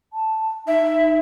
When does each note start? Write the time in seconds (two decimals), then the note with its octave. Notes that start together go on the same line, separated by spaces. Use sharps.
0.13 A5
0.67 D#4 E5